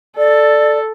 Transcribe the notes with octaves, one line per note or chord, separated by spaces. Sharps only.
A4 D5